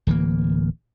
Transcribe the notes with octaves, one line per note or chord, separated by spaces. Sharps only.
D1 E3 A#3